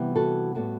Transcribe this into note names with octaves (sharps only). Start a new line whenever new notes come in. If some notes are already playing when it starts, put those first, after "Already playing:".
Already playing: C3 E3 G3 B3
F#4 A4
A2 G3 B3 F#4 A4